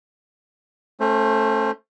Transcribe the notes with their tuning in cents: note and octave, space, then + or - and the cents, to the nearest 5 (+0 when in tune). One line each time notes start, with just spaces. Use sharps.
A3 +0 C#4 -25 C5 +15